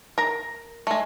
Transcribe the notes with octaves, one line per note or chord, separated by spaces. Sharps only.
A#4 A#5
G#3 A3